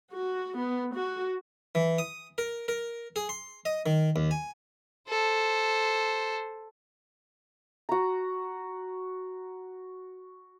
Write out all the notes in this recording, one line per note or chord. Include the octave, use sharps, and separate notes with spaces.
F#4
B3
F#4
E3
D#6
A#4
A#4
G#4
C6
D#5
D#3
D#2
G#5
A4 C5
F#4 A#5